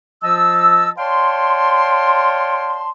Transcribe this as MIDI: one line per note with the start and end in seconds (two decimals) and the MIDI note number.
0.24 0.91 53
0.24 0.91 65
0.24 0.91 75
0.24 0.91 81
0.24 0.91 88
0.98 2.90 73
0.98 2.90 74
0.98 2.90 77
0.98 2.90 79
0.98 2.90 81
0.98 2.90 84